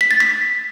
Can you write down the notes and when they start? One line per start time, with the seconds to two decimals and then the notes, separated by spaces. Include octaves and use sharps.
0.01 B6
0.11 A6
0.20 B6